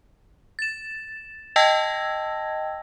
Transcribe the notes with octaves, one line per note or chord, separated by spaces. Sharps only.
A6 E7
D#5 G5 A5 E6 G#6 A#6